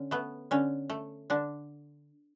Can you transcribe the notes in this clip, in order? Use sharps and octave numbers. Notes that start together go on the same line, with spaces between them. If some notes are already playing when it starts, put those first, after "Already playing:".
Already playing: D3 C#4
A3 B3
D3 C#4
A3
D3 D4